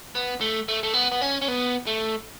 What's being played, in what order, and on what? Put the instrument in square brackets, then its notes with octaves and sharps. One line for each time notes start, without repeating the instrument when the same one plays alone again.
[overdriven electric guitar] B3
A3
A3
A3
B3
B3
C#4
C#4
B3
A3